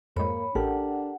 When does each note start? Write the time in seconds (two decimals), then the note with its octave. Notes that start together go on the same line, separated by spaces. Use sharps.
0.16 F2 G#2 A#3 C#5 B5
0.55 A1 D4 G4 A4 A#4 F#5